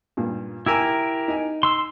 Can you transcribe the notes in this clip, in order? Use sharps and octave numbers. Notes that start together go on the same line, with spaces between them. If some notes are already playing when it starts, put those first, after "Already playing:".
G2 A#2
E4 G4 A#4 G#5 A#5 E6
D#4 G#5
C6 E6